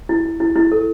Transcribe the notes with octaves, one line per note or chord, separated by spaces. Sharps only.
E4
E4
E4
E4
A4